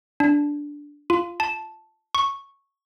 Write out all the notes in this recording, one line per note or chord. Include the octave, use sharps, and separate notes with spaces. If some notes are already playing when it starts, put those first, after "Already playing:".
D4
F4
A5
C#6